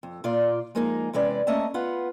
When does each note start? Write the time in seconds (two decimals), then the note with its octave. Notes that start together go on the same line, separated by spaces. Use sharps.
0.03 F2
0.24 A#2 F4 D5
0.75 F3 G#3 A#3 D#4 G#4 A#4
1.13 E2 C3 G#3 C#4 B4 D5
1.47 A3 A#3 C#4 D#5 E5 A5
1.74 B3 F4 F#5